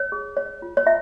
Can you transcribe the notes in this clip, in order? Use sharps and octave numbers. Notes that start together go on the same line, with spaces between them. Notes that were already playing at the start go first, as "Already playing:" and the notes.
Already playing: C#5
G#4
C#5
F4
C#5
F4 E5